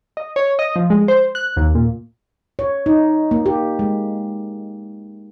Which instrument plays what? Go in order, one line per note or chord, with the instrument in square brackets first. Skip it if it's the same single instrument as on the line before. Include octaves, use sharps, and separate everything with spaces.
[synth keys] D#5
C#5
D#5
F3
G#3
C5
F#6
D#2
A#2
[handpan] C#5
D#4
A#3
G4
G#3